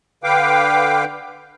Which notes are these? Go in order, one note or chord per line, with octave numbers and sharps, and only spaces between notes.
D3 B4 F5 G5 D6